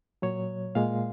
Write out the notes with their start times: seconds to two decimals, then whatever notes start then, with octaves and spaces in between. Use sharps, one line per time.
0.22 A#2 F#3 C#5
0.75 A#2 G#3 F5